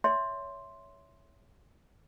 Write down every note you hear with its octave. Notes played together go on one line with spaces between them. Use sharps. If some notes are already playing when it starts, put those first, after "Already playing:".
C#5 E5 C6